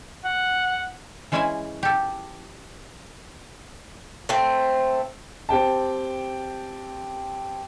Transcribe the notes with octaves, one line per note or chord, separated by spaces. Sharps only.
F#5
E3 G#3 C#4 E4 E5 G#5
G4 A4
A3 C4
C4 G4 G5 A5